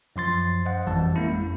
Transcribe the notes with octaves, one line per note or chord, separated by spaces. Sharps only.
F#2 F3 C6 A6
C5 D#5 F5 F#5
G#1 F2 E3 G3 A5
G#3 A#3 C#4 E4
F2